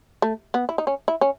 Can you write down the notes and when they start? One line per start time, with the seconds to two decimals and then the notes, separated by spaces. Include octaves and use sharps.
0.22 A3
0.54 B3
0.69 E4
0.78 D#4
0.87 C#4
1.08 E4
1.21 C#4